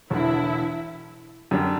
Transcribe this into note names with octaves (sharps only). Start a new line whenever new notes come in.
E1 E2 D3 E4
F#2 D3 G3 D4